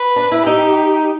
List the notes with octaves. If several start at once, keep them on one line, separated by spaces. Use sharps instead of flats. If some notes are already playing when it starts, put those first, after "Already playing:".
Already playing: B4
D4
E4
D#4 G4